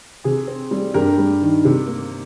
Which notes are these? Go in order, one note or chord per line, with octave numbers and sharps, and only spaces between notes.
C3 G#4
C4
G3
G2 G4 A#4
G3
D#3
C3
A#3